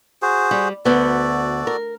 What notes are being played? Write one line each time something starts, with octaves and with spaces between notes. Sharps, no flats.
F#4 G#4 C5
G3
D2 B3 F#4 A4 D5
A#4